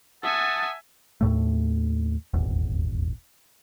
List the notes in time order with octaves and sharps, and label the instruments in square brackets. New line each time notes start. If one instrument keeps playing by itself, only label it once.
[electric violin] E5 G#5 [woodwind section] F#5 A5 D#6
[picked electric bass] D#2 A2 A3
D#1 G#1 E2